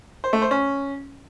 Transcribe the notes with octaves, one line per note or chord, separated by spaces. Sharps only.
C5
A3
C5
C#4